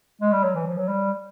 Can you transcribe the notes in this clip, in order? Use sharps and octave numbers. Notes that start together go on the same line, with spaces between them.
G#3
G3
F#3
E3
F3
F#3
G3